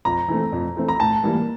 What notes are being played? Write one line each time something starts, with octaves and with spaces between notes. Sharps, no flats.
F2 A#5
E3 A3 C4
F2
E3 A3 C4
A#5
A2 A5
E3 G3 A#3